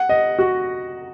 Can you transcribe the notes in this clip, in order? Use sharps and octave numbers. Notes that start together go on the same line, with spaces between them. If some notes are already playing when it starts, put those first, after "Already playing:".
Already playing: F#5
D#5
F#4